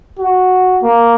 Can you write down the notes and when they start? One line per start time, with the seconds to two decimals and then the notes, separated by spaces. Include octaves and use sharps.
0.19 F#4
0.83 A#3